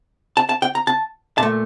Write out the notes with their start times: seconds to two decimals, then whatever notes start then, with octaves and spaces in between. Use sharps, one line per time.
0.37 A5
0.49 A5
0.62 G5
0.75 A#5
0.87 A5
1.38 A#2 A3 A5